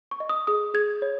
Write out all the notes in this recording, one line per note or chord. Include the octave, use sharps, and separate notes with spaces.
C#6
D#5
D#6
G#4 D#6
G#4 G#6
C#5